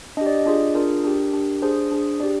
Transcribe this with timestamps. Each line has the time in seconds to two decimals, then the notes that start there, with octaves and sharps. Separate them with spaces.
0.17 D4 G4 D#5
0.26 D5
0.37 D#5
0.46 D4 F4 G#4 D5
0.75 D4 F4 G#4 A#4
1.04 D4 G4
1.34 D4 G4
1.62 D4 G#4 C5
1.92 D4 G#4
2.20 D4 G4 D5